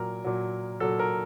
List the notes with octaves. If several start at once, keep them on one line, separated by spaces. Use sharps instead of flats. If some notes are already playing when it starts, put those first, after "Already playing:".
Already playing: A#2 F#3 A#4
A#2 F#3
A#2 F#3 A4
A#4